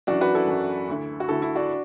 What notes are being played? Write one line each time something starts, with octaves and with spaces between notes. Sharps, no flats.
F#2 E3 D4 F#4
F#4 B4
E4 A4
F#2 E3
D2 D3
F#4
D2 D3 E4 A4
E4
D4 F#4